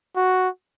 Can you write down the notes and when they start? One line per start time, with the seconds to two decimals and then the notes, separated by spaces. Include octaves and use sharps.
0.16 F#4